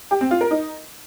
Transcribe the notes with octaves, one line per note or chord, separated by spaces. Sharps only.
G4
C4
F4
A#4
D#4